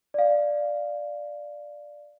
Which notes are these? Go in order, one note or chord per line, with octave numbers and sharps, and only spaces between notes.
D5 F5